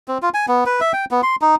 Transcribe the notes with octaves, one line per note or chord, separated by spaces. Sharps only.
C4
F4
G#5
B3
B4
E5
G5
B3
C6
D#4